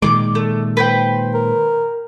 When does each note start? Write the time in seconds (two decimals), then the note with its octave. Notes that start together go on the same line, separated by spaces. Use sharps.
0.02 A#2 D#3 G#3 D6
0.35 A3
0.77 B4 C5 G5
1.34 A#4